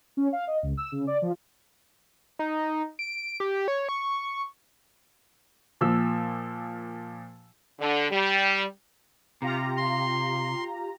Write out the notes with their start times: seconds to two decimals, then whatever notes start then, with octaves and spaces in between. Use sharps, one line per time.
0.17 C#4
0.33 F5
0.47 D#5
0.63 C#2
0.77 E6
0.92 C#3
1.07 D5
1.22 F3
2.39 D#4
2.99 D7
3.40 G4
3.68 C#5
3.89 C#6
5.81 A#2 F3 E6
7.80 D3
8.11 G3
9.42 C3 F4 G4 A#5
9.77 C6